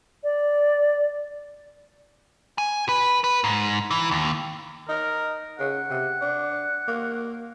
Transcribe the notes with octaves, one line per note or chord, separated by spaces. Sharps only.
D5
G#5
B4
B4
G#2
E3
D#2
D#4 A#4
C#3 F#5
C3
D4
A#3